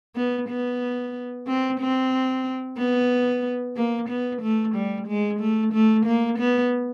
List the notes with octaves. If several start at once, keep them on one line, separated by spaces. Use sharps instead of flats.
B3
B3
C4
C4
B3
A#3
B3
A3
G3
G#3
A3
A3
A#3
B3